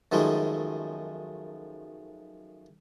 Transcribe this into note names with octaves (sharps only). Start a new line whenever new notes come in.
F#2 D#3 F3 G#3 A3